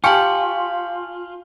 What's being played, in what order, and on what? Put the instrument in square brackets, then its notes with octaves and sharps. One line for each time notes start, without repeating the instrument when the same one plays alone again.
[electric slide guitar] F4 [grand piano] G4 C#6 C#7 [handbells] G#5 A5 [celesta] F6 F#7